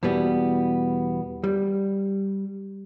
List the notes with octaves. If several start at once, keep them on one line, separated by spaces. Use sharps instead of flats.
E2 B2 E3 G3 B3
G3